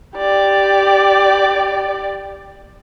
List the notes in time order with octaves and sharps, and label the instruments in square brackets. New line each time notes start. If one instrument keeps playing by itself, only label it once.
[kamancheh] G4 D5